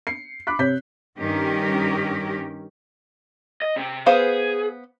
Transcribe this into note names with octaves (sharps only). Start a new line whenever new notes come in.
C7 C#7
B5 D6 F#6 B6
C3 C4 C#5 G6 B6
G2 D#3 C#4 G4 A#4
D#5
C3 C4
B3 G#4 C5 F5